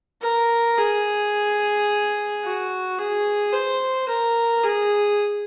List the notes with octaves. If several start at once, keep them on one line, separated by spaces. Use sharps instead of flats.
A#4
G#4
F#4
G#4
C5
A#4
G#4